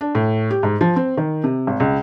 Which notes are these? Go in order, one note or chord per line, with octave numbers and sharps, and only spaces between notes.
D4
A2
G4
G#2
F3
C4
D#3
C3
G#1
C#2